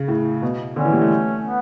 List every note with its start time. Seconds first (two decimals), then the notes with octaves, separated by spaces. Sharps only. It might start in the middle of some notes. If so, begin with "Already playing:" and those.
Already playing: C#3
0.08 A2
0.42 B2
0.76 D3 C#4
0.85 E3
0.93 G3
1.01 A3
1.44 B3